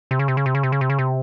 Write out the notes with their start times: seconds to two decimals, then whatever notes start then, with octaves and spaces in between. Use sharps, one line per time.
0.11 C3
0.19 C#3
0.28 C3
0.37 C#3
0.46 C3
0.55 C#3
0.63 C3
0.72 C#3
0.81 C3
0.90 C#3
0.99 C3